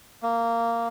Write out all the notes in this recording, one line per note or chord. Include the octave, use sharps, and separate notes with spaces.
A#3